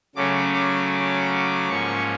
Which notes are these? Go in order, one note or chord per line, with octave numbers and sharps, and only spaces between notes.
C#3 F#3 A3 C#4 D6
D6
D6
G#2 F3 A#3 C#4 C#6